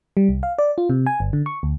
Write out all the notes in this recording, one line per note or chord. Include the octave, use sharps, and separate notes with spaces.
G3
C2
F5
D5
F4
C3
G#5
G1
D3
C#6
D2